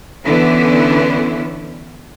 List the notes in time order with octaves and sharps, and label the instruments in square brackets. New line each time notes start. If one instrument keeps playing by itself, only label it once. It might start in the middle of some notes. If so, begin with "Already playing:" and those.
[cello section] D3 E3 B3 C#4 E4